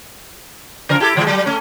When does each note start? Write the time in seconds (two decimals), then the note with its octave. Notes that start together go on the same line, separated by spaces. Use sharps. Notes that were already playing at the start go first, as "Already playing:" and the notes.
0.89 C#3 F3 A#4
1.00 E4 G4 A4
1.16 A2 E3 G#3
1.27 F#3 G3
1.46 A3 C#4